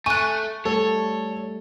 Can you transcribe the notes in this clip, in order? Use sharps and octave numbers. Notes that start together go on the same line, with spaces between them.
A3 G#5 C#6 F#6
G3 A3 A4 C#5